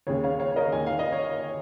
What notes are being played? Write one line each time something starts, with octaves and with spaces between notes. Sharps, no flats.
D#2 C#3 G#4 C#5
C#5 F5
C#5 F5
C#5
A#4 D#5
D#2 D#3 G#5
F5
D#5
C#5